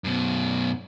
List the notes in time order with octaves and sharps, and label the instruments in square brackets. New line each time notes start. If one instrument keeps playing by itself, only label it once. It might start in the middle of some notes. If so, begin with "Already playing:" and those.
[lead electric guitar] F#2 B2